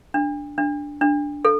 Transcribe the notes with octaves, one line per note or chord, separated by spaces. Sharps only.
D4
D4
D4
A4